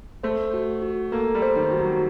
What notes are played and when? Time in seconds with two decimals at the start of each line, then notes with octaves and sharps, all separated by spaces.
0.23 A3 C5
0.54 F#4
0.82 F#4
1.12 A#3 A4
1.35 G3
1.42 C5
1.56 D#3
1.71 F#4
1.78 F#3